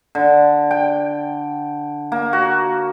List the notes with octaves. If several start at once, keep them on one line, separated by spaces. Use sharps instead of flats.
D3
G5
A#3
F#4